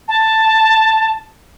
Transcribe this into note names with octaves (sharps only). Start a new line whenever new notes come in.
A5